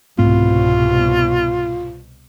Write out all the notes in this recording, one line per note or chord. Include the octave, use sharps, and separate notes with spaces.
C2 G#2 B2 A3 C4 F4